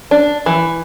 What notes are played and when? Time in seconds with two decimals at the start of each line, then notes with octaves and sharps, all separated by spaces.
0.11 D4
0.46 E3